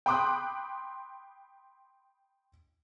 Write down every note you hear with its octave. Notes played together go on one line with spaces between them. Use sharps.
G5 B5 C6 D6 D#6 F#6